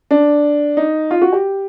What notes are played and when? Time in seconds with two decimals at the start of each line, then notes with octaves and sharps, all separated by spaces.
0.11 D4
0.77 D#4
1.11 F4
1.22 F#4
1.33 G4